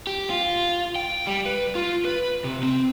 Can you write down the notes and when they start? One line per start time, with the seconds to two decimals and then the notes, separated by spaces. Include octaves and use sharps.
0.07 G4
0.30 F4
0.96 G5
1.27 G3
1.46 B4
1.75 F4
2.05 B4
2.44 C3
2.63 C4